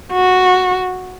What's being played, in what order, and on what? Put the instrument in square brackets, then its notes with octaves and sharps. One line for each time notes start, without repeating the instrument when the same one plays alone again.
[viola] F#4